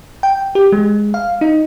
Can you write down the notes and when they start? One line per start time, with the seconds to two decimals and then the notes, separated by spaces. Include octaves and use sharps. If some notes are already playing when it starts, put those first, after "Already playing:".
0.23 G5
0.55 G4
0.72 G#3
1.14 F5
1.41 D#4